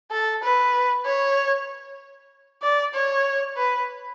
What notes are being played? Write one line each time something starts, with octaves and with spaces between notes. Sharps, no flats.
A4
B4
C#5
D5
C#5
B4